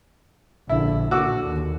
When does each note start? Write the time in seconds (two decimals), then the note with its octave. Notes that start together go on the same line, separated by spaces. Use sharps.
0.69 A#1 D3 E4
1.11 A#2 D3 F#4 D6 E6
1.46 D#2